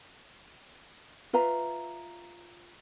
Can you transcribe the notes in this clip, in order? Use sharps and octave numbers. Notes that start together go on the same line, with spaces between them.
F4 B4 E5 A#5